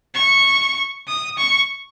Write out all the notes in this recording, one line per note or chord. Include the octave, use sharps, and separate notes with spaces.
C#6
D#6
C#6